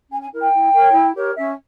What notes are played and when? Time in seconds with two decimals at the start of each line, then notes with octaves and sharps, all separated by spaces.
0.10 C#4 G#5
0.20 G#5
0.31 E4 A#4
0.41 G5
0.52 E4
0.73 A#4 C#5
0.93 E4
1.14 G4 A#4 C#5
1.35 C#4 E5